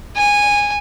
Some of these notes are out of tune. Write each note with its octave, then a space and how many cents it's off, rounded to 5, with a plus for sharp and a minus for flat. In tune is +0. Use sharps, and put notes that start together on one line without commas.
G#5 -15